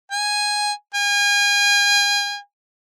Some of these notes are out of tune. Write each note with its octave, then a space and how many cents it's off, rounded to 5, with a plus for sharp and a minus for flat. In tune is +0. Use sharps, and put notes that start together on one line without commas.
G#5 -5
G#5 -35